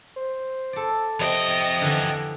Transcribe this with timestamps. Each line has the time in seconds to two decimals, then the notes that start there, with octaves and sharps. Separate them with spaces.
0.16 C5
0.73 A4 D5
1.20 F2 C3 D#5 G5
1.81 D3 E3